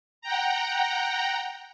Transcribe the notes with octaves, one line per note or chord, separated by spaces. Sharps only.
F#5 G5 A#5